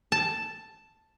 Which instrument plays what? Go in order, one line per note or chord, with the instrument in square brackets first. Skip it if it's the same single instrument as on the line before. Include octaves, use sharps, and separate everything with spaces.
[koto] A5